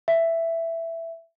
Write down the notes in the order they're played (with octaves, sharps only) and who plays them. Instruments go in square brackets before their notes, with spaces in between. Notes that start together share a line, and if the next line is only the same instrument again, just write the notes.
[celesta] E5